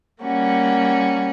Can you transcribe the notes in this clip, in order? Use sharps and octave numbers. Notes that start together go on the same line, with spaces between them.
G3 A#3 C#4 F#4